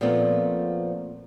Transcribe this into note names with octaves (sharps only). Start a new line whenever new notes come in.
A#2 F3 A3 B3 C4